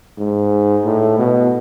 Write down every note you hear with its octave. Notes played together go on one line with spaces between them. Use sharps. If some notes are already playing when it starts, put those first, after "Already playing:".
G#2
A2
B2